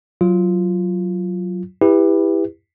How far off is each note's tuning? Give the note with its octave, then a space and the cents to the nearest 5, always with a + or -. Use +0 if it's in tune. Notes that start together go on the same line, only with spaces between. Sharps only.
F#3 +0 F4 -10
E4 -5 G4 +25 B4 +0